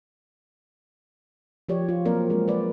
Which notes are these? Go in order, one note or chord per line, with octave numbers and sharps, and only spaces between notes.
F3 G4 C#5 D5
F4
F#3 A#3 C4 A#4 D5
G#3 C4 G#4
B4 D5